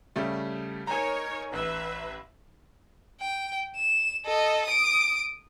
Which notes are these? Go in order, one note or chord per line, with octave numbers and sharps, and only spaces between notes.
C#3 G3 A3
D#4 A#4 C#5 G#5 A#5
A1 B4 E5
G5
E7
A4 D#5
D#6 D7